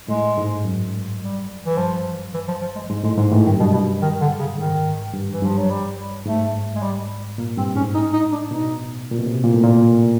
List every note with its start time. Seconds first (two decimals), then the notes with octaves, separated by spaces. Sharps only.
0.08 A2 G#3
0.38 G#2
0.65 F#2
1.21 G3
1.66 E3
1.77 G2 F3
2.34 E3
2.48 F3
2.61 F3
2.75 G#3
2.89 G#2 G#3
3.04 A2 G#3
3.18 G#2 G#3
3.31 A2 E3
3.46 G2 D#3
3.54 F#2
3.60 G2 B2
3.74 B2
4.02 D#3
4.21 D3
4.39 C#3
4.58 G#2 D#3
5.14 G2
5.32 E3
5.42 G2 F3
5.57 F#3
5.70 G3
6.26 G#2 A3
6.75 G#3
6.82 G3
7.38 A#2 A#3
7.57 G2 C4
7.76 G#2 C#4
7.94 A2 D#4
8.13 D#4
8.32 D4
8.51 B2 D#4
9.11 A#2
9.19 B2
9.25 C3
9.44 A#2
9.54 A2
9.63 A#2